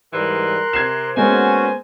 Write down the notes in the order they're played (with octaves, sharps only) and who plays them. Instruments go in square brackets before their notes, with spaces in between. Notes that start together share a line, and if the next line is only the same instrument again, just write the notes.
[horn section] G#2 E3 G3 [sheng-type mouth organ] A#4 C6 F#6
[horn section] C3 [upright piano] G#6 C7 E7
[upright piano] G#3 A#3 B3 [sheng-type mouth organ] C#4 F#4 [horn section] C5 G#5